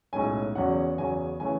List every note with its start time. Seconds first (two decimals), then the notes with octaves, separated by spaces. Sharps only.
0.13 B1 A2 G#3 C#4 G#5
0.55 E2 C#3 F#3 C#4 F#5
0.98 E2 C#3 F#3 C#4 G#5
1.40 C#3 E3 A3 C#4 G#5